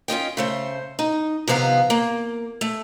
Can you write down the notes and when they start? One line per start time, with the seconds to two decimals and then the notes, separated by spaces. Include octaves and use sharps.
0.08 C#4 F4 D#5 G5
0.37 C#3 A3 C5
0.99 D#4
1.48 C3 D#3 F3 B3 F5 A#5
1.90 A#3
2.61 A3